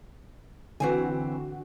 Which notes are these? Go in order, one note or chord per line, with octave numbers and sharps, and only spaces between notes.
D3 E3 C4 F#4 G#5